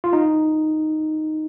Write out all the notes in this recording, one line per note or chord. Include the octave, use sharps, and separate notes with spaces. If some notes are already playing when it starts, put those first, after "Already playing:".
F4
D#4